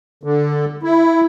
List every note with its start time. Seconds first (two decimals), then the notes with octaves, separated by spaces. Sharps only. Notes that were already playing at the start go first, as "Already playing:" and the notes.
0.23 D3
0.83 E4